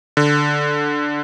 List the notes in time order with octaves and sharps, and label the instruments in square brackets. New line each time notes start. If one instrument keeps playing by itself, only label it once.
[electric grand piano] D3